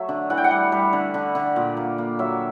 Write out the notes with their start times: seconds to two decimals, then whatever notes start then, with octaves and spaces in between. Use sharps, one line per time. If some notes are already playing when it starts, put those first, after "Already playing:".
Already playing: F#3 A3 E5
0.09 D3
0.30 E3 F#5
0.37 G5
0.44 F#5
0.51 G3
0.72 G3
0.93 D3
1.14 D3
1.35 D3
1.56 A#2
1.77 A#3
1.98 A#3
2.19 F#3 E5